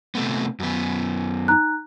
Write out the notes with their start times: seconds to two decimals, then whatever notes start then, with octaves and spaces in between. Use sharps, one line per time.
0.15 C3 A3 B3
0.60 F#2 B3
1.48 D#4 A#5 F#6